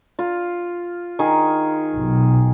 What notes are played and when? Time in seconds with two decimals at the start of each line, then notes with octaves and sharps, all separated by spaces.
0.19 F4
1.19 D#3 G#4
1.95 B1